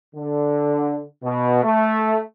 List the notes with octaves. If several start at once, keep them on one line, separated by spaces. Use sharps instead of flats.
D3
B2
A3